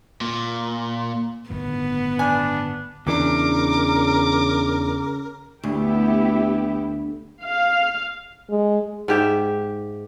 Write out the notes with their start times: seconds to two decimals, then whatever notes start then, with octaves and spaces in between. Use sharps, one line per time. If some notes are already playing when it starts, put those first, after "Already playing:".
0.21 A#2
1.50 G1 A2 D#3 B3
2.19 D4 G#5
3.07 E2 C#3 E3 D4 A#4 D6
5.63 D2 B3 E4 G4
7.44 F5
8.50 G#3
9.08 G#2 G4 E5